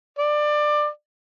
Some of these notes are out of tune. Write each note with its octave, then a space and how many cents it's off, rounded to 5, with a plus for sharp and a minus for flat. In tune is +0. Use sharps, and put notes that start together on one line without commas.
D5 +20